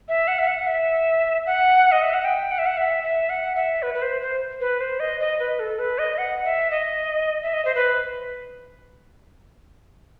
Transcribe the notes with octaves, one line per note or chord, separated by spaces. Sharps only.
E5
F#5
E5
F#5
E5
F#5
D#5
E5
F#5
G5
F#5
E5
F#5
E5
E5
F#5
E5
B4
B4
C5
C5
B4
C5
D#5
D#5
B4
A4
B4
D#5
F#5
E5
D#5
E5
D#5
C5
B4